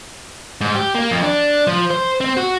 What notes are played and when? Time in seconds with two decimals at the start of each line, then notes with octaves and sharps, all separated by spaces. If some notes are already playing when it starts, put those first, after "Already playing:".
0.61 G#2
0.75 G4
0.95 A#3
1.11 F2
1.23 D4
1.67 F3
1.91 C5
2.21 C4
2.37 F#4